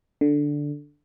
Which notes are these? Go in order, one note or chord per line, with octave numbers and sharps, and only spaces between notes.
D3